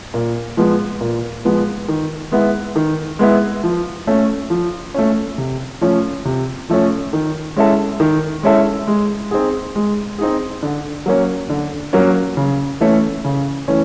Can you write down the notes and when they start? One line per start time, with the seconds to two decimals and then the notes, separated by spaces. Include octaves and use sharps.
0.14 A#2
0.57 F3 G#3 B3
1.01 A#2
1.45 F3 G#3 B3
1.88 D#3
2.32 G#3 B3 E4
2.76 D#3
3.19 G#3 B3 E4
3.64 F3
4.07 A3 C#4
4.50 F3
4.94 A3 C#4
5.38 C3
5.81 F3 A3 C#4
6.25 C3
6.70 F3 A3 C#4
7.13 D#3
7.56 G#3 C#4 E4 A4
8.00 D#3
8.43 G#3 C#4 E4 A4
8.87 G#3
9.31 C4 D#4 G#4
9.75 G#3
10.18 C4 D#4 G#4
10.63 D3
11.06 F#3 A#3 C#4
11.49 D3
11.93 F#3 A#3 C#4
12.37 C#3
12.81 E3 A3 C#4
13.24 C#3
13.68 E3 A3 C#4